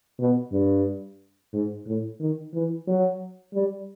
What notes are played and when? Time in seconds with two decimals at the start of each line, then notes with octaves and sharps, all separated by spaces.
0.19 B2
0.52 G2
1.53 G#2
1.87 A2
2.20 D#3
2.54 E3
2.87 F#3
3.54 G3